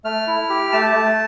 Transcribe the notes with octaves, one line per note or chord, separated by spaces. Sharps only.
A3 F6
E4
G4
A3 A5
A3